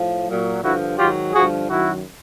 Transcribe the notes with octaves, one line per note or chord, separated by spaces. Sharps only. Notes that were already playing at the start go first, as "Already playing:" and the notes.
Already playing: A2 F3
A#2 F#3
G2 D3 F3 E4 F#4
G#2 D#3 F#3 F4 G4
G2 D3 F3 F#4 G#4
F#2 D#3 F#3 E4 F#4